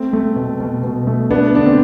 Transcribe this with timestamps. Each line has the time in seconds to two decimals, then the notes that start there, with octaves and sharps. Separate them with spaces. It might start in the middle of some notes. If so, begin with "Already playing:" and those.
Already playing: A3 C4
0.13 A3
0.36 B2
0.60 B2
0.84 B2
1.07 A3
1.31 A3 B3 D4
1.54 D3 D4
1.66 C4